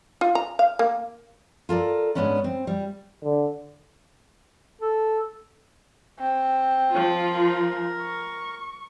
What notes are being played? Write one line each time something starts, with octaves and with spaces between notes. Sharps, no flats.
F4
A#5
F5
A#3
F4 A4 A#4 D5
G#2 E3 G#3 B3 C#4 D4
C4
G3
D3
A4
C4
F3 F4
A#4
C#6